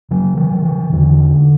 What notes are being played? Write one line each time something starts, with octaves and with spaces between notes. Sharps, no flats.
C#3 F#3
E3
C#3
E3
E2 D3